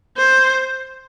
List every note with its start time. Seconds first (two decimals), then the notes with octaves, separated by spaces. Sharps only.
0.17 C5